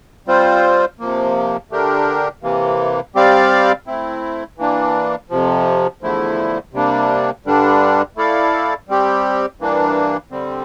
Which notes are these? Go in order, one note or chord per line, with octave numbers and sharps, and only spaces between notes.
G3 C4 F4 C5
C3 F3 A#3
D3 A3 D4 G4 A#4
C3 E3 A#3
G3 C4 G4 D5 F5
A3 C4 E4
E3 A#3 D4
F2 C3 F3
E2 D3 F3 A3 E4
C3 G3 A#3 D4
G2 D3 G3 D4
A3 E4 A4 D5 F5
G3 C4 G4
G2 E3 A#3 D4
D3 G3 C4